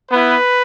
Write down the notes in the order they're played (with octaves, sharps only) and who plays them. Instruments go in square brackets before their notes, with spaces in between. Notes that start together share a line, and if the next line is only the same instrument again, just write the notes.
[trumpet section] B3 E4 B4